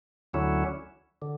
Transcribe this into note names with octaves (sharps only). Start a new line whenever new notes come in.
D2 D3 F#3 C#4 E4
D3